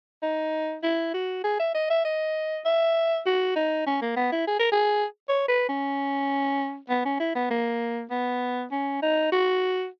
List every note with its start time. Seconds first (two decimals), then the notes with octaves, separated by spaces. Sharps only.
0.23 D#4
0.83 E4
1.14 F#4
1.44 G#4
1.59 E5
1.74 D#5
1.90 E5
2.05 D#5
2.65 E5
3.26 F#4
3.56 D#4
3.86 C#4
4.01 A#3
4.16 B3
4.32 E4
4.47 G#4
4.59 A#4
4.72 G#4
5.28 C#5
5.48 B4
5.69 C#4
6.89 B3
7.05 C#4
7.19 E4
7.35 B3
7.50 A#3
8.10 B3
8.71 C#4
9.02 D#4
9.32 F#4